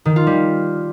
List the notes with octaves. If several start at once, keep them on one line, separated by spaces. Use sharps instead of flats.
D#3
F4
G3